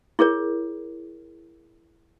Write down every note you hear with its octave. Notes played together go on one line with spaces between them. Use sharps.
E4 G#4 A#4 C#5